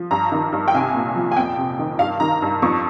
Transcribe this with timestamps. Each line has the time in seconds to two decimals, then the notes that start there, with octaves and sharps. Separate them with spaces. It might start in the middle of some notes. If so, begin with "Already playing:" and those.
Already playing: F3
0.11 G2 A#5
0.32 D#3
0.52 G2
0.68 G5
0.74 C2 G#5
0.94 A#2
1.16 F3
1.31 G#5
1.36 F2 G5
1.58 C3
1.79 D#3
1.99 G2 F5
2.20 D#3 A#5
2.42 G2
2.62 F2 C#6